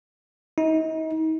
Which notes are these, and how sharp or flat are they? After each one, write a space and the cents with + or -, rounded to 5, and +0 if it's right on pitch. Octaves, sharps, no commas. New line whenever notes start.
D#4 +35